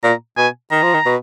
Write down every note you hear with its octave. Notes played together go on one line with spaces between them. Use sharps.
A#2 A#5
B2 G#5
D#3 A#5
F3
D#3
B2